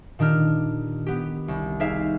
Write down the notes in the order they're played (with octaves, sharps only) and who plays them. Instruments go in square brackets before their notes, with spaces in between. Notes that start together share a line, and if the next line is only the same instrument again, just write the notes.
[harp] A#2 D#3 D4 G4 F6
B3 G4
C2
D#4 G4 G#4 C5 E5 F5